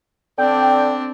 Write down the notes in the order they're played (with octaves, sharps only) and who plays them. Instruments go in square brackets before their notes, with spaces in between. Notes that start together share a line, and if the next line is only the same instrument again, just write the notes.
[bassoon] D3 [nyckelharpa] C4 D4 [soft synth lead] G5